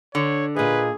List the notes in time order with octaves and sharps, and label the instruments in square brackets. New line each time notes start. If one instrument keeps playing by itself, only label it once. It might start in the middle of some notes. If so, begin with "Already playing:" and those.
[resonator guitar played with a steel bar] D3 [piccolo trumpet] C#5
[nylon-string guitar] A#2 D#5 [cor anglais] G#4 [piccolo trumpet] B4